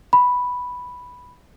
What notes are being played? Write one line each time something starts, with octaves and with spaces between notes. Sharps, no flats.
B5